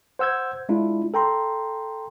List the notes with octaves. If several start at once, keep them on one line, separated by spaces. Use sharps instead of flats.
C5 F#5 E6 G6 G#6
G#3 D4 E4 F4
A4 G5 A#5 C6